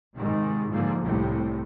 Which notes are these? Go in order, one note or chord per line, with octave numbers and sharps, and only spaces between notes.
G#2 C3 D#3
G#2 D3 F3 A#3
C2 A2 C3